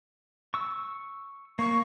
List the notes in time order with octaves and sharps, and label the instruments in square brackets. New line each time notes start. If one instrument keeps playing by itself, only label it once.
[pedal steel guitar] C#6 E6
[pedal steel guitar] A#3 [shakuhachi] C#6